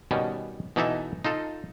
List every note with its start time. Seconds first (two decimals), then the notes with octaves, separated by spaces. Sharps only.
0.11 B2 D#3 G3 C#4
0.76 B2 E3 D#4 A4 E5
1.24 D#4 F4 A4